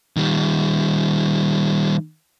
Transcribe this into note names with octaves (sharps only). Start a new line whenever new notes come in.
D#3 G3